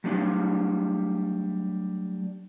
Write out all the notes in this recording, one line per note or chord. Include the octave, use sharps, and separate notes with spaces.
F#3 G3 A3 D4